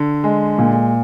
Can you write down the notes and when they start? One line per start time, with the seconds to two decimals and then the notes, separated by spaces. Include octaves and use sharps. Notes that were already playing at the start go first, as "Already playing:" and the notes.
Already playing: D3
0.24 G#3
0.58 A#2